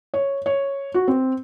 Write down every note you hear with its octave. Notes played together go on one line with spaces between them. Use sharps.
C#5
C#5
F#4
C4